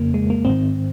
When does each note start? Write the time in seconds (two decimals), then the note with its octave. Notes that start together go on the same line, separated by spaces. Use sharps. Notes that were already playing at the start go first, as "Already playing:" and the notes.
Already playing: F2 C#3 A#3
0.14 G#3
0.30 A#3
0.45 G#2 D#3 C4